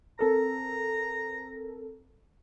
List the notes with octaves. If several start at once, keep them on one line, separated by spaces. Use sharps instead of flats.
C4 A4 A#4 A#5